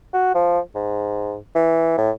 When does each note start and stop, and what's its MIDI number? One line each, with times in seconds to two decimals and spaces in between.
0.14 0.33 66
0.35 0.59 53
0.75 1.37 44
1.55 1.96 52
1.98 2.11 45